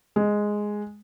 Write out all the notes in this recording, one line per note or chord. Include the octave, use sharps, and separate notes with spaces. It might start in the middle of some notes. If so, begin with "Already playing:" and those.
G#3